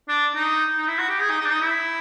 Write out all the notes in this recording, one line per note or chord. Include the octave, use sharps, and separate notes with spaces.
D4
D#4
D#4
E4
F#4
G4
G#4
D#4
D#4
D4
D#4
E4